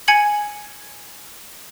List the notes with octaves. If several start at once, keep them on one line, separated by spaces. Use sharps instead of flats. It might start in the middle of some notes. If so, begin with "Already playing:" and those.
G#5 G#6 C#7 F#7